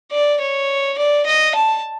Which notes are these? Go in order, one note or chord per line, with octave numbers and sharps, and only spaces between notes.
D5
C#5
D5
D#5
A5